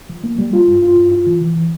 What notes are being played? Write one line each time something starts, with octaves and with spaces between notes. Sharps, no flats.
F3
A#3
G3
F4
G2
F4
G2
F4
E3
E3
E3